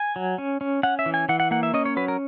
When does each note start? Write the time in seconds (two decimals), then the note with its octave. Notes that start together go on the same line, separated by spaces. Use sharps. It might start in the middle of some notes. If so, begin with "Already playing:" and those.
Already playing: G#5
0.16 F#3
0.38 C#4
0.61 C#4
0.83 C#4 F#5
0.99 E5
1.06 E3
1.14 G#5
1.29 E3 F#5
1.40 F#5
1.51 A#3 F#5
1.63 E5
1.74 C#4 D#5
1.85 C#5
1.97 F#3 B4
2.08 A#4